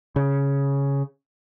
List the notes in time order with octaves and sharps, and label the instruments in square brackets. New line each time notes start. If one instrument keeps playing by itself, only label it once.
[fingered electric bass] C#3